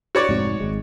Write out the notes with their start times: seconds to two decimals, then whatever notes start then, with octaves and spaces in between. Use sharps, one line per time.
0.15 F#4 C#5 D5
0.29 F1 G#2 C4
0.60 G#1 G#3